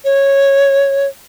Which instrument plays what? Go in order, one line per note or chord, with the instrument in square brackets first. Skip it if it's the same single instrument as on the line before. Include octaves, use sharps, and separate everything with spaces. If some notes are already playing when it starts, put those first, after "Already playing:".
[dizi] C#5